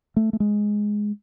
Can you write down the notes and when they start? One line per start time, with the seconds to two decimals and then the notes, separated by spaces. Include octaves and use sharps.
0.16 A3
0.33 A3
0.40 G#3